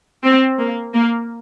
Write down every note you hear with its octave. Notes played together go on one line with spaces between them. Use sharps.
C4
A#3
A#3